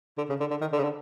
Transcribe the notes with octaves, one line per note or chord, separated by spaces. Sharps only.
D3
C#3
D3
D3
D#3
D3
C#3
D3